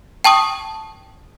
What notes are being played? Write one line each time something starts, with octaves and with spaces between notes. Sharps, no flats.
G5 A5 C#6 D#6